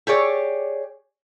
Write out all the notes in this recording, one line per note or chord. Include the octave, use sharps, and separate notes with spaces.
G4 G#4 C#5 D5